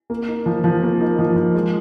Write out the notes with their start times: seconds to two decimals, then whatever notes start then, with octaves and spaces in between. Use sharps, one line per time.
0.10 A#3
0.28 D#4
0.46 F3
0.64 F3
0.83 A#3
1.00 D#4
1.19 F3
1.36 F3
1.55 G#3